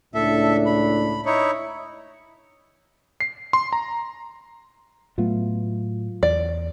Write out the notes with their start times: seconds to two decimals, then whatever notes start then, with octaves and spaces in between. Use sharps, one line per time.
0.14 C#2 A2 D4 A4 E5
0.66 B5
1.26 D#4 E4 C#5
3.20 C7
3.53 C6
3.73 A#5
5.18 A2 F#3 A3 B3 F4
6.23 E2 D5